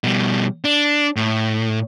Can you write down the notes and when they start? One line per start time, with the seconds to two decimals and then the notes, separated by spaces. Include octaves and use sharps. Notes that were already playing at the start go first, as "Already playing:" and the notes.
0.04 B2 G3
0.64 D4
1.16 A2